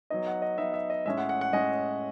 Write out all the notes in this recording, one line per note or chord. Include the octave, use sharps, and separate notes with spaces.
F#3 B3 D#4 D#5
F#5
D#5
F#3 B3 D#4 E5
E5
D#5
A2 G#3 C#4 E5
F#5
F#5
F#5
A2 G#3 C#4 D#5